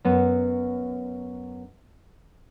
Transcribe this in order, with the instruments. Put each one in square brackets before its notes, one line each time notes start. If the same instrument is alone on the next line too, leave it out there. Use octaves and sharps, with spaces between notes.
[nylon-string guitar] F#2 B3